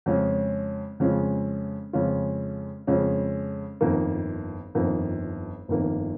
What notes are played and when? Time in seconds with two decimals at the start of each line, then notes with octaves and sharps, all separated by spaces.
0.06 F2 C#3 G#3 C#4 F4
1.00 F2 C#3 G#3 C#4 F4
1.93 F2 C#3 G#3 C#4 F4
2.87 F2 C#3 G#3 C#4 F4
3.81 G1 F2 D#3 A#3
4.75 G1 F2 D#3 A#3
5.68 G1 F2 D#3 A#3